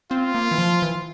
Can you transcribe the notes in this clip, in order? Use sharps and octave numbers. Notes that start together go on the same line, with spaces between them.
C4 F4
A#3
E3
F3
E3